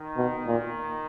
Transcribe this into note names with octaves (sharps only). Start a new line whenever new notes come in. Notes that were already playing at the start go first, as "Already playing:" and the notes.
Already playing: D#3
B2
A#2